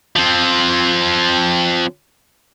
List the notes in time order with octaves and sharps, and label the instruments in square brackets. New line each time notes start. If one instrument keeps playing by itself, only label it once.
[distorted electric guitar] F3 C4